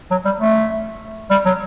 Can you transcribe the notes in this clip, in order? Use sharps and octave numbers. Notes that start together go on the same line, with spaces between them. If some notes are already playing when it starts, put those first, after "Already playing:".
F#3
G3
A3
G3
F#3